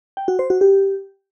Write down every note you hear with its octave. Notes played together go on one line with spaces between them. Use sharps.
G5
F#4
C5
F#4
G4